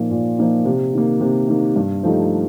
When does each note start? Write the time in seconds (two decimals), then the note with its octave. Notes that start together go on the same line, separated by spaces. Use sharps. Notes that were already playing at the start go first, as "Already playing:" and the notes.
Already playing: A#2 F3 A#3 D#4
0.11 A#2
0.39 F3 A#3 D#4
0.65 C3
0.93 D#3 A#3
1.21 C3
1.48 D#3 A#3
1.76 G2
2.03 F3 A3 D#4 G4